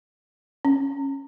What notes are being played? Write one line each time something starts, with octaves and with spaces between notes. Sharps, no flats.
C#4